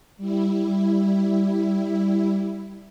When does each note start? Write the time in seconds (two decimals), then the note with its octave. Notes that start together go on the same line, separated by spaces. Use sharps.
0.17 G3 E4